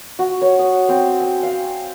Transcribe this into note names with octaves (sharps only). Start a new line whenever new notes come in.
F#4
C#5
D#6
C4
G#5
F5